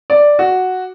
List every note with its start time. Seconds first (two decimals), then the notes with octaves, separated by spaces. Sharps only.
0.10 D5
0.39 F#4